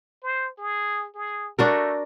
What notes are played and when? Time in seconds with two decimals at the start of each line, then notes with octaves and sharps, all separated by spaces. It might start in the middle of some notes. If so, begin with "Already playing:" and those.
0.23 C5
0.58 G#4
1.15 G#4
1.59 A3 D4 F#4 A#4